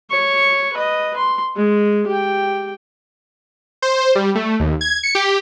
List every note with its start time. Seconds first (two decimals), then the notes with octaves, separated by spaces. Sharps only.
0.11 C#5 C#6
0.73 B4 D#5
1.17 C6
1.56 G#3
2.07 G4 G5
3.82 C5
4.15 G3
4.35 A3
4.60 D#2
4.81 G#6
5.03 C#7
5.15 G4